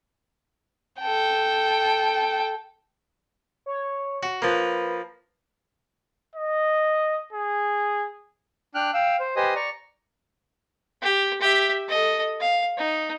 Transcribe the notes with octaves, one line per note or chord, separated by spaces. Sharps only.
A4 G5
C#5
F#4
F3 A#3 B4
D#5
G#4
D4 G5 F6 F#6
F5 G5 E6
C5
G4 B4 C5 D#5 G#5 D#6
D5 A#5 C#6
G4
G4 E5
A4 D#5
F5
D#4